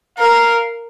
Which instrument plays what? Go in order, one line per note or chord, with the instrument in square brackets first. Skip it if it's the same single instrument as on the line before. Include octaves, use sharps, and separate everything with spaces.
[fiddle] A#4 [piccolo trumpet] F5